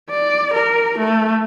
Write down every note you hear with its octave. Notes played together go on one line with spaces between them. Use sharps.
D5
A#4
A3